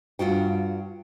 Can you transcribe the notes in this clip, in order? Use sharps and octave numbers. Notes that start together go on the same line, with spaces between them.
G2 F4 F#4 G5